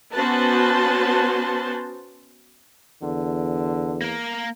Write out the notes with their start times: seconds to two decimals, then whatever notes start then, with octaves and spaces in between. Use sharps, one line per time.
0.14 B3 C#4 F#4 B4 C5 A5
3.02 E2 D3
4.02 A#3 A#4